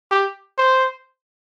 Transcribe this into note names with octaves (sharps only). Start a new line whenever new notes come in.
G4
C5